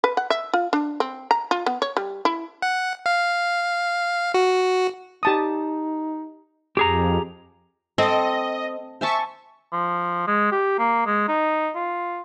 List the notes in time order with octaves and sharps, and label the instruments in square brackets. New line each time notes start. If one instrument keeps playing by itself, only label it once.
[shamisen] B4
F#5
E5
F4
D4
C4
A#5
F4
B3
C#5
G3
E4
[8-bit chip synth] F#5
F5
F#4
[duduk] D#4 [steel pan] G4 A5 D#6
[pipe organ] F2 [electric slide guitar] G4 G#4 A#5
[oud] C4 [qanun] A4 [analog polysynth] D#5
[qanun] C5 G#5 A5 [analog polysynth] E5 C#6
[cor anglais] F3
G#3
G4
A#3
G#3
D#4
F4